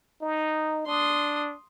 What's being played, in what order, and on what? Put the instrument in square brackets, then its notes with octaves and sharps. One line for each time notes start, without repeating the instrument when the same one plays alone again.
[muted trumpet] D#4
[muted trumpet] D4 [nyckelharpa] C6 D#6